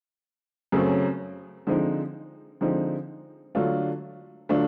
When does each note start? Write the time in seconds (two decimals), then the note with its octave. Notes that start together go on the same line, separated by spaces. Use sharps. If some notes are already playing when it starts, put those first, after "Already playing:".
0.72 F#2 C#3 F#3 A3 C4
1.67 D3 F3 G#3 C4 D#4
2.61 D3 F3 G#3 C4 D#4
3.55 D3 F#3 A3 D4 F4
4.49 D3 F#3 A3 D4 F4